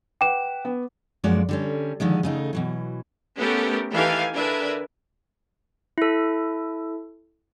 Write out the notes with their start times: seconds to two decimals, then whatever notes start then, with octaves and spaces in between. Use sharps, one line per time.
0.21 B4 F#5 G5 D6 E7
0.65 B3
1.24 F#2 F3 G#3 A#3 F#4 D5
1.49 D3 G3 C#4
2.00 D3 D#3 F3 G#3
2.23 C#3 A3 D#4
2.53 B2 E3 F#3
3.37 A3 B3 C#4 G4 A4 A#4
3.93 D#3 E3 G4 A4 F5 G#5
4.34 D3 D4 A#4 B4 E5 G#5
5.98 E4 A4